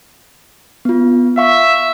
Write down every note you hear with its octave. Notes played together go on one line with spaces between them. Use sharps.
B3 F4
E5 F5 C#6